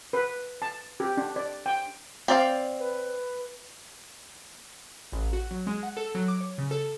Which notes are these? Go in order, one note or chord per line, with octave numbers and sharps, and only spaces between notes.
B4
A5
G4
D4
D5
G5
C4 D5 F5
B4
A1
F#4
F#3
G#3
F#5
A4
F#3
D6
C#5
C#3
A4